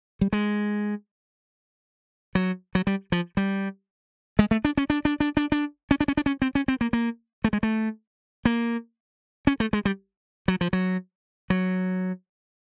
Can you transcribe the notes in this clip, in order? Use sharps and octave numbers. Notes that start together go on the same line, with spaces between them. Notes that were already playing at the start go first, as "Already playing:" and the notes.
G3
G#3
F#3
F#3
G3
F3
G3
G#3
A3
D4
C#4
D4
D4
D4
D4
D4
C#4
D4
C#4
D4
C#4
C4
C#4
C4
A#3
A#3
A3
G#3
A3
A#3
C#4
A3
G#3
G3
F#3
F3
F#3
F#3